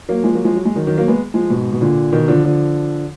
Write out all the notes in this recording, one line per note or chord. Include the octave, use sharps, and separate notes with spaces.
F#3 A#3
F3 G#3
F#3 A#3
F3 G#3
F#3
G#3
D#3 F#3
D#3 F#3
F#3 A#3
G#3 B3
F3 G#3
G#2 B2
B2
A#2 D3
B2 D#3
D3 F3
D3 F3